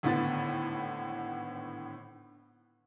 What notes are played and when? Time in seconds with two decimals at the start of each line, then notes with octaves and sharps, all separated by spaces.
0.03 G#1 A2 D3 B3 A6